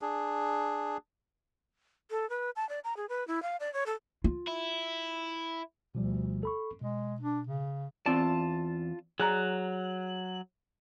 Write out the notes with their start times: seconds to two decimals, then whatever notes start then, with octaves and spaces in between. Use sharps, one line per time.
0.02 D4 G#4
2.11 A4
2.30 B4
2.56 A5
2.69 D5
2.84 A#5
2.97 G#4
3.09 B4
3.27 E4
3.42 F5
3.60 D5
3.74 C#5
3.86 A4
4.24 F4
4.48 E4
5.95 D2 B2 F3 G3
6.43 A4 B5 C#6
6.82 B2 G#3
7.20 D4
7.47 C#3
8.06 E2 C4 F4 D5 A5
9.20 F#3 G#4 D5 A#5 F#6